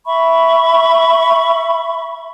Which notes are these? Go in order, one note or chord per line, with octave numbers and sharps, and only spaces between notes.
E5 B5 C#6